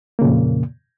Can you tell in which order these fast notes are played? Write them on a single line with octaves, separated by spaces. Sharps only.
A#3 C#3 A#2 F2